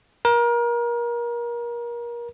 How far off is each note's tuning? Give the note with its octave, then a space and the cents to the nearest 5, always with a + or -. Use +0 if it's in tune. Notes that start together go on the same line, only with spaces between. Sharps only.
A#4 +30